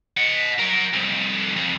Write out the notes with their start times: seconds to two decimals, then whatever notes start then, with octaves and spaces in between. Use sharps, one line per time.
0.17 D#5 F#5
0.59 F#3 A#4
0.93 C2 F2
1.56 F2